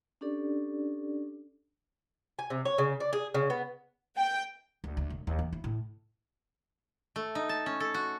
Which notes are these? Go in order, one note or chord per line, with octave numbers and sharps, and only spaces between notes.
C#4 D4 G4 A4 D5
G#5
C3
C#5
C#3
D5
G#4
C#3
B3
G5
D2
D2
E1
D#2
E3
E4
A2
A3
D#4
A5
C#4
A4
F#4